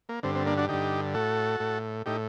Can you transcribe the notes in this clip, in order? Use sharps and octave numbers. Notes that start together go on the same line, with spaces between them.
A#3
G2 D3 C4
C4
A#3 D4
D4 F#4
G2 D3 D#4 G4
A2 F#4 A4
A2
A2 D#4 G4